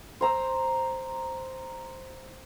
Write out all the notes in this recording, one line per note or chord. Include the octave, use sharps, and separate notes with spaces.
C5 A#5 E6